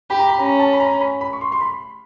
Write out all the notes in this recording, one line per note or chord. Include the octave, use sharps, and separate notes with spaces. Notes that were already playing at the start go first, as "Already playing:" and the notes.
G4 B5
A#5
B5
C#4 A#5
A5
B5
A#5
B5
B5
C#6
C6
C6
B5